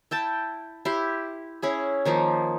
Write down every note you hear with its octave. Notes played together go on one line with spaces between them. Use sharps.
E4 G5 A5
E4 G4 C6
C#4 E4 G#4
D#3 F3 A#3 D#4